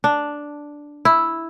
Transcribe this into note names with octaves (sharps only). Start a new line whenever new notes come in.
D4
E4